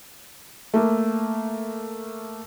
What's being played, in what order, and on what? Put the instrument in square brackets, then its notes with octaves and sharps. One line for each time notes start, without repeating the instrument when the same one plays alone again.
[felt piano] A3 A#3